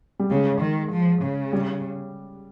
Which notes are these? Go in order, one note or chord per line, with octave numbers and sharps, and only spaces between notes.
G3
C#3 G#3
D#3
F3
C#3
G3